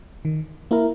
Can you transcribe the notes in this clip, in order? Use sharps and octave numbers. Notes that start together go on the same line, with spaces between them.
D#3
A#3 E4 A#4